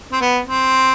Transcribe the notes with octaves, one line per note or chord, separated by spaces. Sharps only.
C4
B3
C4